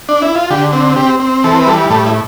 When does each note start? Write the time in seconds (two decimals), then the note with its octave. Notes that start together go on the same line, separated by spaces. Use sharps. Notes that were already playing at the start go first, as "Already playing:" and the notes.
0.09 D4
0.22 E4
0.36 F4
0.50 D3 G4
0.73 C4
0.96 C4 G4
1.20 C4
1.44 E3 A4
1.57 B4
1.67 G3 A4
1.90 A2 A4
2.06 E4